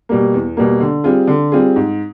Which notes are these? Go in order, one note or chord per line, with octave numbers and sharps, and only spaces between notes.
B2 G3 A#3
E2
B2 G3 A#3
D3
G3 C4 F4 G#4
D3
G3 C4 F4 G#4
G#2